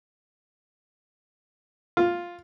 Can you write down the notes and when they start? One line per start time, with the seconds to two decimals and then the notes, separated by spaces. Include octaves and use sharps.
1.97 F4